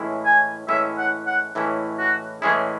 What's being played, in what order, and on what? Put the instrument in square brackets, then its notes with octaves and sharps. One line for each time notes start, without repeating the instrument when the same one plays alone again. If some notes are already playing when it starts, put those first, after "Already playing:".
Already playing: [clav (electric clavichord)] A2 E3 G#3 C#4 E4
[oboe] G#5
[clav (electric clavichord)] A2 E3 G#3 C#4 E4 [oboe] E5
[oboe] F#5
F#5
[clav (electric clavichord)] A2 E3 G#3 C#4 E4
[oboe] F#4
[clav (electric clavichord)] A2 E3 G#3 C#4 E4 [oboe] G#4